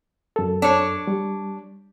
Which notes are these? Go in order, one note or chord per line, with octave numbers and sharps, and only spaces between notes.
F#2 A4
D4 C#5
G3